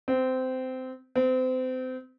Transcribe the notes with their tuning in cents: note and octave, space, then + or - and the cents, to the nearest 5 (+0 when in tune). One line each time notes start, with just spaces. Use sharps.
C4 -20
C4 -30